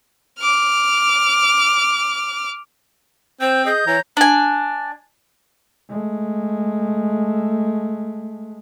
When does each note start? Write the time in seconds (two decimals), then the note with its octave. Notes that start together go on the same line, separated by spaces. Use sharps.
0.39 D6 F6
3.41 C4 C5 G6
3.66 G#4 D#5 G6
3.87 E3 C#5 A#5
4.17 D4 G#5
5.90 G#3 A3